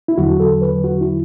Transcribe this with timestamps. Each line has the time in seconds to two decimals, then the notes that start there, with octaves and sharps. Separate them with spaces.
0.08 E4
0.18 E2 D3 F#3 F#4
0.40 A4
0.62 B4
0.84 F#4
1.01 E4